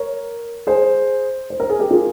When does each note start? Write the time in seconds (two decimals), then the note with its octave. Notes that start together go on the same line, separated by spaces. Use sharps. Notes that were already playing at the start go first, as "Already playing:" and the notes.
Already playing: A#4 C#5
0.67 G#4 C5
1.50 C5
1.60 A#4
1.70 G#4
1.79 G4 A#4
1.91 F4 G#4